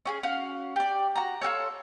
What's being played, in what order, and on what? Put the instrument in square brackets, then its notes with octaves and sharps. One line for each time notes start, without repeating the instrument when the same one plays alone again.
[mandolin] C#4 G4 G#4
C#4 F#4 F5
G4 D5
F#4 A#5
F4 F#4 A4 C#5